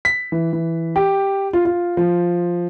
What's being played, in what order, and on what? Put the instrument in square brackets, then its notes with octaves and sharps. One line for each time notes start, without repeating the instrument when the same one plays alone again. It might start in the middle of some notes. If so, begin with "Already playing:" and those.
[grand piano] B6
E3
E3
G4
F4
F4
F3